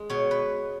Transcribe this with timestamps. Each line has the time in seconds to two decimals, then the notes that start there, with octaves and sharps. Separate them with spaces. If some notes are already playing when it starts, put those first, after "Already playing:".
Already playing: G#3
0.10 B2 C#5
0.31 B4